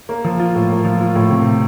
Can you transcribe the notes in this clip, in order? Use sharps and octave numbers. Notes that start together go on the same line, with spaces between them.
A#3
F3
F4
A2
A#3
F3
F4
A2
C3